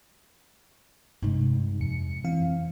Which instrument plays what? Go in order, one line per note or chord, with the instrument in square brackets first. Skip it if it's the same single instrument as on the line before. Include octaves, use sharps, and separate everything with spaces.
[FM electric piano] G2 D#4 [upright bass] C3 G#3
[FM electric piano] F2 C#7
E3 C4 F5